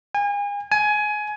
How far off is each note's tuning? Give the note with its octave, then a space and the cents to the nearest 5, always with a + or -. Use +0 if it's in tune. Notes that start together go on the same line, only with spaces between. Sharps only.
G#5 -35
G#5 +20